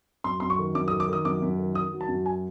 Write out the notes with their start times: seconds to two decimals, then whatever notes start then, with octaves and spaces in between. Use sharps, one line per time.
0.24 F#2 C6
0.40 F#2 C6
0.50 C#6
0.58 D#3
0.75 F#2 D6
0.88 D#3 D#6
1.00 D6
1.08 D#3 D#6
1.25 F#2 D6
1.42 F#2
1.59 D#3
1.75 D#3 D#6
1.92 F#3
2.01 A5
2.08 F#2
2.26 G#5